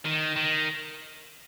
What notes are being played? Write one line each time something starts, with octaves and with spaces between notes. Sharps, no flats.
D#3
D#3